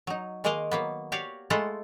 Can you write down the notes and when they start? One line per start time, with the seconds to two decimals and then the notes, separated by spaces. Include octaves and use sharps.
0.07 F#3 D#4
0.44 D#3 G#3 A#3 A#4 D#5 F5
0.71 F#3 A#3 B3
1.12 F#4 G4 C#5 D5 F5
1.50 G#3 A3 E4 F4 A4 F#5